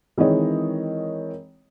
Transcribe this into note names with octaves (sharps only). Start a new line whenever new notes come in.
D#3 E3 G#3 C4 C#5 D#5